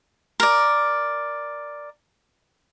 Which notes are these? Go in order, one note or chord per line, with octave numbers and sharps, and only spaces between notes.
A#4 D5